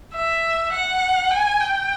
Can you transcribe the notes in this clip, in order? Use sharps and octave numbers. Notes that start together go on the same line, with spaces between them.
E5
F#5
G#5
G5